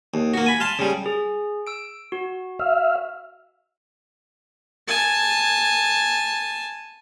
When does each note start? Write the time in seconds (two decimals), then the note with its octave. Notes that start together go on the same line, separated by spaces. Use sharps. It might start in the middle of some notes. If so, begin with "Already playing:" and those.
0.14 D#2
0.34 A#3 F#4
0.46 G#5 B5
0.60 F5 A5 C6
0.79 C#3 G3
1.06 G#4
1.67 E6 D7
2.12 F#4
2.59 E5 F5
4.87 G#5 A5